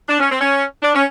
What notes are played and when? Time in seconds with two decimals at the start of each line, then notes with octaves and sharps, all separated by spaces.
0.08 D4
0.20 C#4
0.30 C4
0.41 C#4
0.83 D4
0.94 C#4